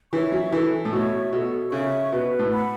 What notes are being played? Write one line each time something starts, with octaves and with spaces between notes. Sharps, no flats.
E3 C#5 E5 C#6
F#3
E3 A4
A2
B2 C#5 E5 C#6
B2 A4
C#3 C#5 E5 C#6
B2 B4
A2
F#5 B5